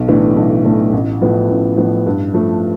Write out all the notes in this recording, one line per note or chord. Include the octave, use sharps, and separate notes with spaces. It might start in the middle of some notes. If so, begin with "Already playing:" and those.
Already playing: B1
A2 E3 A3 D4
B1
A2 E3 A3 D4
A1
A2 F3 B3
A1
A2 F3 B3
G2
F3 A3